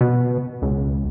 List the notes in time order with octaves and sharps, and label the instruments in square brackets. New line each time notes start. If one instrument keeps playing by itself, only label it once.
[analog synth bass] B2
C#2